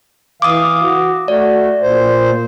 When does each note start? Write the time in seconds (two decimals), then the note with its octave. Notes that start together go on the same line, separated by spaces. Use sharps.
0.42 E3 F5 D6 D#6
0.83 F#4
1.28 A3 F#4 D5
1.82 A#2 C5